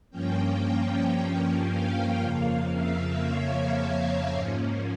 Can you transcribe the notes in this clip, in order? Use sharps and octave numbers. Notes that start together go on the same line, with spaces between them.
G2 F3 A#3 C#4 G5
G5
F5
F2 C#3 F3 A#3 F5
E5
C#5
G#2 F3 A#3 C#4